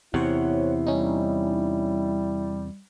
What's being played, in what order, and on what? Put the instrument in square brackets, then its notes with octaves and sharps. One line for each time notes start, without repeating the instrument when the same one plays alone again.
[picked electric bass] E2 C3 [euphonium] E4 [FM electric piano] C5 C#5 F#5
[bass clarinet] G3 [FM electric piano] C#4 D#4